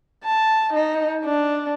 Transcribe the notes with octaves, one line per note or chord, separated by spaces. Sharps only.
A5
D#4
D4